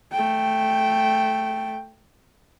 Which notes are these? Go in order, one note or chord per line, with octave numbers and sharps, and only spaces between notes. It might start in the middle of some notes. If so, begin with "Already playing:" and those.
A3 G5